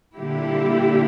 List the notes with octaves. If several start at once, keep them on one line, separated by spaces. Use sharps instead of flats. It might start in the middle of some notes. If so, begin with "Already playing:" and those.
A#2 D3 G3 A#3 E4 G4